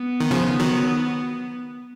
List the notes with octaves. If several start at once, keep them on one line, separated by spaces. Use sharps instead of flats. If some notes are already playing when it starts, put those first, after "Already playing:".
Already playing: B3
D#3
C#3 F3
D#3 F#3